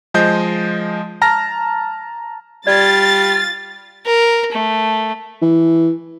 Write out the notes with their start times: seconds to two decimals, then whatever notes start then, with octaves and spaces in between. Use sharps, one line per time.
0.14 F3 G#3 C5 D#5 G6
1.22 A5 A#5 F6 A#6
2.67 G3 F4 D5 A6
4.06 A#4
4.52 A3
5.42 E3